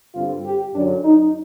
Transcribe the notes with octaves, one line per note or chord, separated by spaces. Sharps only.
G2 D3 G3 C4 F4
G4
F#2 D3 F#3 D4
D#4